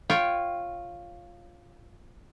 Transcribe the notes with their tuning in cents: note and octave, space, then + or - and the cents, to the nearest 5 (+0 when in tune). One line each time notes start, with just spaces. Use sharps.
F4 +0 C#5 -10 G5 +0